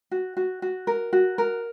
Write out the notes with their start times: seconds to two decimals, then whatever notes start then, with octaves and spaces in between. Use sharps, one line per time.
0.11 F#4
0.37 F#4
0.62 F#4
0.87 A#4
1.13 F#4
1.38 A#4